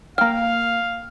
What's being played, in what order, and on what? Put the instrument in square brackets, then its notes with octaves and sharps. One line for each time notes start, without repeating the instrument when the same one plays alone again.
[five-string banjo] A#3 G5 [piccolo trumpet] F5 [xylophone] F6